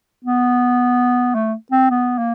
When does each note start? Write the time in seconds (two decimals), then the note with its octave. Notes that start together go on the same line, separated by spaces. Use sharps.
0.24 B3
1.35 A3
1.72 C4
1.90 B3
2.18 A#3